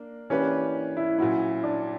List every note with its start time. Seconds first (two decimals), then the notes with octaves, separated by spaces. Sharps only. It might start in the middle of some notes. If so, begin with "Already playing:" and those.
Already playing: A#3 D4 A#4
0.30 E3 A#3 C#4 D4 G4 B4
0.97 E4
1.19 A#2 F#3 C#4 E4 F#4
1.64 D4